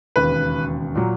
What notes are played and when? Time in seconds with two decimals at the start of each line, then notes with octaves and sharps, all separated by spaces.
0.16 E1 D#2 C#3 B4
0.95 A#2 F#3